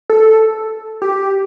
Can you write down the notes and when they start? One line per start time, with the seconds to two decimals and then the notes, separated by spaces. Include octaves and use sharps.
0.10 A4
1.02 G4